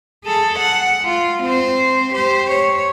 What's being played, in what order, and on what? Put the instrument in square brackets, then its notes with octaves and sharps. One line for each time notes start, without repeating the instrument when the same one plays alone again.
[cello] G#4 A4
F#5
F4
C4 C5
G4 C5
C#5